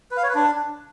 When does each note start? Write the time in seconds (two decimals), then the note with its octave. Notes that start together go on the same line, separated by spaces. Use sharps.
0.11 B4
0.17 F5
0.23 C#5
0.29 B4
0.35 D4